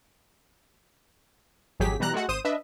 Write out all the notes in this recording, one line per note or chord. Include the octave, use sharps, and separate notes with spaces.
G#1 F2 F#3 G4 G#4 B6
B2 E3 G3 A#5 F#6
G#3 A3 F#4 F#5
G#1 C5 D#6 D#7 E7
D4 B4 D#5 E5